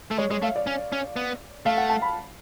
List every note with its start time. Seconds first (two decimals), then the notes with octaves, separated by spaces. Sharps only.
0.11 A3
0.18 G#3 C#5
0.31 G#3 C#5
0.42 A3 F5
0.56 D5
0.67 C#4
0.92 C#4
1.16 B3
1.66 A3 F5
1.77 F#5
1.90 A5
2.02 B5